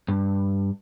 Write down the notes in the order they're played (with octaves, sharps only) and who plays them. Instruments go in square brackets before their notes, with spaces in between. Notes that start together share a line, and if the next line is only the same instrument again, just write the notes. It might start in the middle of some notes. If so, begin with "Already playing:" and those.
[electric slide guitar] G2